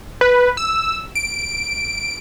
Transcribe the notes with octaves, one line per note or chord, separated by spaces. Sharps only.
B4
E6
D7